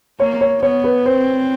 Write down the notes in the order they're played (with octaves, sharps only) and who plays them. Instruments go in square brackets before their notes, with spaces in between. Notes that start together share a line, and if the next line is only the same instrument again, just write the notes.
[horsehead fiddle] A#3 [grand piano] C#5
[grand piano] C#5
[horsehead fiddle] B3 [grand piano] C#5
[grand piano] B4
[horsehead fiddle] C4 [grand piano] C5